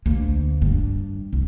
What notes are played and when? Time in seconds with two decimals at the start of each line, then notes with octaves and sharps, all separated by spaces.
0.06 D2 A#3
0.62 G2
1.33 C2